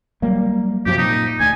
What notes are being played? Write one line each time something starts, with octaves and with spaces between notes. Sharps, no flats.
F#3 G3 A#3
F#2 C3 F3 G4
A#2 D#4
D2 D3 G#5